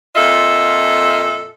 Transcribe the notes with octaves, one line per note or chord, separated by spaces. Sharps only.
F2 A#2 F4 A4 D#5 E5